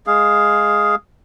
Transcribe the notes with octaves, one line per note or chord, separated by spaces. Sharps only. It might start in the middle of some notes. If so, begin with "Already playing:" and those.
G#3 G#4 F5